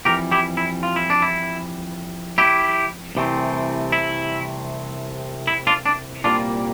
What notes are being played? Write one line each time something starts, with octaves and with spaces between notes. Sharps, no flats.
F2 E3 G3 G4 A#4
E4 G4
E4
F4
E4
D4
E4
E4 G4
C2 C3 E3 A3 C4
E4
E4
D4 F4
D4
C2 A#2 G3 A#3 D4 F4